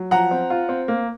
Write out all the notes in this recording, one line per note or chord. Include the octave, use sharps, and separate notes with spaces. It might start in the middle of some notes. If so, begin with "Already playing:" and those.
Already playing: F#3
F3 F#5 A#5
C4
F4
C4
A#3